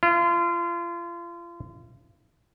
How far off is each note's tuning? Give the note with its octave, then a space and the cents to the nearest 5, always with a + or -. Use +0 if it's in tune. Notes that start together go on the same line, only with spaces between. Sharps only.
F4 -30